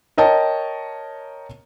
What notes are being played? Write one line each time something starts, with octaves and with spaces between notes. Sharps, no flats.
A#4 C#5 D#5 G5 A5